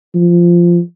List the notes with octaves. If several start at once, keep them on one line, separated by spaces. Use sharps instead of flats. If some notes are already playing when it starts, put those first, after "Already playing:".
F3